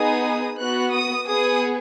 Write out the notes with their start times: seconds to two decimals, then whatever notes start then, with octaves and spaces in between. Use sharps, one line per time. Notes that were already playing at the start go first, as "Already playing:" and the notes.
Already playing: B3 D#4 G#4 D#6
0.57 B3 F#4 F#6
0.92 D#6
1.27 B3 G#4 D#6